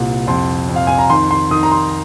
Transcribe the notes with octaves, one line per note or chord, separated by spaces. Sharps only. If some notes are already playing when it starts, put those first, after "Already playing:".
Already playing: C2 A#2
F2 C6
F2
F5
G#5
A#5
D#3 C6
C6
D#3 D#6
A#5
C6